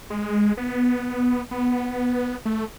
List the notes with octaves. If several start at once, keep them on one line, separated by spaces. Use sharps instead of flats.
G#3
B3
B3
A3